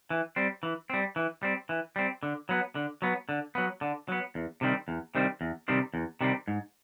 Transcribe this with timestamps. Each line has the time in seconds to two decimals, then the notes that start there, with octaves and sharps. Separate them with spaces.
0.10 E3
0.36 G3 C4
0.63 E3
0.90 G3 C4
1.16 E3
1.43 G3 C4
1.69 E3
1.96 G3 C4
2.23 D3
2.49 F#3 B3
2.75 D3
3.02 F#3 B3
3.29 D3
3.55 F#3 B3
3.81 D3
4.08 F#3 B3
4.35 E2
4.61 C3 D#3 G3 C4
4.88 E2
5.15 C3 D#3 G3 C4
5.41 E2
5.68 C3 D#3 G3 C4
5.94 E2
6.21 C3 D#3 G3 C4
6.48 G#2